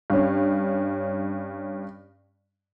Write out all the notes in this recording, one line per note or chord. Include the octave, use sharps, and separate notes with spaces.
G2 C#4